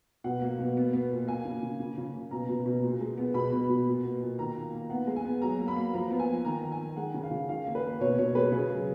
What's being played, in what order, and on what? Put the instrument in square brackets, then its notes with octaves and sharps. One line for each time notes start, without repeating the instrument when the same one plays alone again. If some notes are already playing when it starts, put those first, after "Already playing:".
[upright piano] B2 F#5
A#3
B2
B3
B3
A#2
A#3 G#5
C#3
C#3
C#3
C#3
A#3
B2 A#5
B2
B2
A#2
G#3
B3
B2 B5
B2
B2
A#2
B3
A#2
D#3 A#5
A#3
A#3
B3 F#5
G#3
G#5
B3
F#3 A#5
A#3
B5
A#3
F3 A#5
B3
G#5
F3
D#3 A#5
D#3
G#5
D#3
G#3 F#5
C#3
F5
C#3
D#3 F5
A#3
B4
A#3
B2 C#5
B2 C#5
G#3 B4
C#3 G#4
F#3